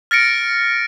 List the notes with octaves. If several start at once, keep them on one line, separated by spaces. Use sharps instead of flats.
F6 A6 A#6 C#7 D7